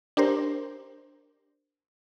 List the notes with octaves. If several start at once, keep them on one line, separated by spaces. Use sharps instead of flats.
D4 G4 A#4 C5